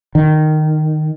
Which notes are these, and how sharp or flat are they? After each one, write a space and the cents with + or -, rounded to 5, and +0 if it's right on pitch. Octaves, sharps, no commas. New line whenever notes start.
D#3 -10